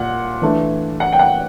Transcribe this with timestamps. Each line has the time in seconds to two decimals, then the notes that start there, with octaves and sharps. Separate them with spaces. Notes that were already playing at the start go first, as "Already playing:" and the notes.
Already playing: A#2 F#5
0.42 E3 A3 D4
1.00 F#5
1.13 G5
1.19 F#5